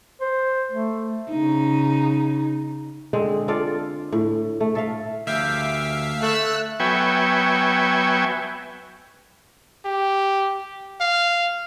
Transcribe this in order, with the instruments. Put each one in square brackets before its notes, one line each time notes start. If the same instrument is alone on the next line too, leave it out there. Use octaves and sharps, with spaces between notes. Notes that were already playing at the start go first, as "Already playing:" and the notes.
[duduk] C5
A3
[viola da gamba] C#3 D#4
[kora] D3 G#3 C4
F4 A4 D5 F5
A2
A3
A4 E5 F5
[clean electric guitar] D2 G4 [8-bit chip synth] E5 F5
[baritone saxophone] A3 [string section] E6 F#6
[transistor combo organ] F#3 B3 E5 G5 G#5 C#6
[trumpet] G4
F5